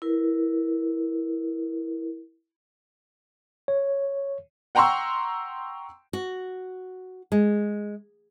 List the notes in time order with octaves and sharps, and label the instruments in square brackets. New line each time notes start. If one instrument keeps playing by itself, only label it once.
[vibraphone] E4 A#4 B4
[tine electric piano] C#5
[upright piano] F#5 G5 A#5 C6 C#6 E6
[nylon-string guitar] F#4
G#3